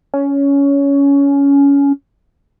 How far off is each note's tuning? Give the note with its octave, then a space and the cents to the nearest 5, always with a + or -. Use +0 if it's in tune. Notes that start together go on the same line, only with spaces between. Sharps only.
C#4 +15